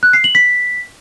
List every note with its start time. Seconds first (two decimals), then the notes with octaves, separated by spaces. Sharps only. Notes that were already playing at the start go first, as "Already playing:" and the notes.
0.03 F#6
0.13 C7
0.24 F#7
0.35 B6